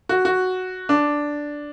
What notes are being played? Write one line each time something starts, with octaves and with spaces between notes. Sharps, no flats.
F#4
F#4
D4